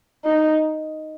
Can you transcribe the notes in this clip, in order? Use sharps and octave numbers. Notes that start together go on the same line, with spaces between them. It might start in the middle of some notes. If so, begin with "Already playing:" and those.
D#4